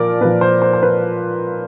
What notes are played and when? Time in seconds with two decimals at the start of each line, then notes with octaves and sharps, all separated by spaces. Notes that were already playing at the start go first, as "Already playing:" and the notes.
Already playing: A#2 F3 A#4 D5
0.21 A#2 F3 B4
0.41 C5
0.62 C5
0.73 C5
0.83 B4